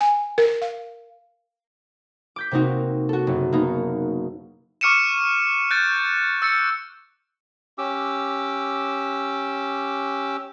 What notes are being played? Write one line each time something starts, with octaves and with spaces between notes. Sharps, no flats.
G#5
A#4
F5
D6 G6 B6
C3 A#3 C4 D#4 F#4
F#4 A4
F#1
A#3 B3 D#4
C#6 D6 F6 C#7 D#7 E7
F#6 G6 A6 D7
E6 A6 C#7
C#4 G4 D6 E6